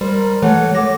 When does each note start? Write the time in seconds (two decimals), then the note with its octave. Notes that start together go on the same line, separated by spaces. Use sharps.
0.01 G3 A#4 C5
0.42 E3 A3 C#5 F#5
0.75 A3 D6 A#6